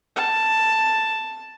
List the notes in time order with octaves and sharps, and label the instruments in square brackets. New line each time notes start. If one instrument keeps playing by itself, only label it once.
[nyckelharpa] A5